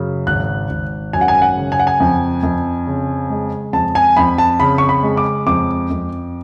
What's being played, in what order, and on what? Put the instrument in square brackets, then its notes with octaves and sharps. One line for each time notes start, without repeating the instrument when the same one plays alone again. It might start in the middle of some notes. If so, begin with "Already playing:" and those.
Already playing: [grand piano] F#2 C#3
G#1 F#6
G#1
F#2 G#5
F#5
G#5
F#5
C#3
G#5
F#5
G#5
F2
F2
C#3
G#3
F2 A5
G#5
F2 B5
A5
C#3 B5
C#6
B5
G#3
D6
F2 D6
F2